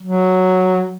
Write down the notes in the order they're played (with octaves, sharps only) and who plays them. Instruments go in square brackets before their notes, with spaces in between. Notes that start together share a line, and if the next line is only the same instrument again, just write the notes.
[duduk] F#3